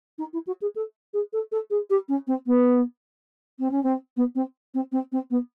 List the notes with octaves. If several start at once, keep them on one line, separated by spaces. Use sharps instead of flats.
D#4
E4
F#4
G#4
A4
G#4
A4
A4
G#4
G4
C#4
C4
B3
C4
C#4
C4
B3
C4
C4
C4
C4
B3